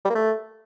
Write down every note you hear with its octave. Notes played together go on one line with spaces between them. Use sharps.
G3
A#3
A3